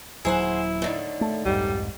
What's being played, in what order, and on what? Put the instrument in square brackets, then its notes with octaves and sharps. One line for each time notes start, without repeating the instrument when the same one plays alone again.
[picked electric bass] D#1 F#3 [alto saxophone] E4 [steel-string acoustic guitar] G#4 C5 F#5
[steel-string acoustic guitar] A2 D3 D#3
[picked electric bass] A3
[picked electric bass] C2 F2 G#2 [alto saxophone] G3